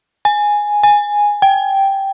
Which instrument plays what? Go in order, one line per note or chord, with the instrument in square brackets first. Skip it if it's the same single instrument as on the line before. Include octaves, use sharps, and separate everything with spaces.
[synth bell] G#5
G#5
G5